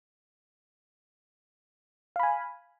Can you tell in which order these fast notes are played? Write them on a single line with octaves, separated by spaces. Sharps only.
F5 B5 G#5